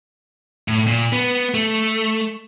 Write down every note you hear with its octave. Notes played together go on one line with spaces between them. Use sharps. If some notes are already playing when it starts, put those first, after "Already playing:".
A2
A#2
B3
A3